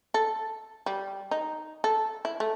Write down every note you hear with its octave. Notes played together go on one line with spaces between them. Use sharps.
A4
G3
D#4
A4
E4
A3